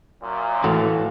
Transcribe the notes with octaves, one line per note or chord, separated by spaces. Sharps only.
F#2 A#2
A2 E3 F#4 A4 F5